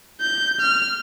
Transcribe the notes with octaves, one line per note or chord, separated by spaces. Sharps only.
G6
F6